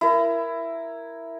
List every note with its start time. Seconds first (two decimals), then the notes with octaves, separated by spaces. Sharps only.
0.01 E4 A#4